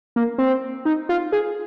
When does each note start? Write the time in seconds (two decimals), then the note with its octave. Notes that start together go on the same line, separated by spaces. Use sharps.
0.16 A#3
0.38 C4
0.85 D#4
1.09 F4
1.32 G#4